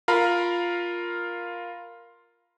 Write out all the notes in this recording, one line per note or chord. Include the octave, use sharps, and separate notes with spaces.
F4 A#4 F5 A#5 B5